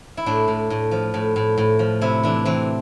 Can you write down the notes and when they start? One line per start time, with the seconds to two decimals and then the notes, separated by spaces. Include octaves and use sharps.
0.17 E4
0.26 A2 D4
0.48 A2
0.70 A2
0.91 F3
1.14 A2
1.36 A2
1.58 A2
1.79 F3
2.01 C3 E4
2.23 E3 D4
2.45 E3 C4